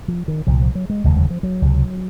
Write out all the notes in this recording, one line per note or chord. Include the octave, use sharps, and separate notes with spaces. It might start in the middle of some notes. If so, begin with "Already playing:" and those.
F3
D#3
C2 A#2 F3
F3
F#3
G#3
F1 D#2 C#3 G#3
F#3
F3
F#3
C#2 C3